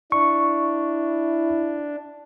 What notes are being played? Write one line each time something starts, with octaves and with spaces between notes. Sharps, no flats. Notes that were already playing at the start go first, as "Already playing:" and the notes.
D4 E4 C#6